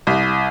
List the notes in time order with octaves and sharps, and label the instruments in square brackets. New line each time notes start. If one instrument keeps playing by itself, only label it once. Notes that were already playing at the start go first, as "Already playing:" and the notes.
[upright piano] C2